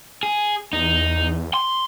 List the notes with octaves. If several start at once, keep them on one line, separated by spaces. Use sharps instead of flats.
G#4
E2 D#4
C6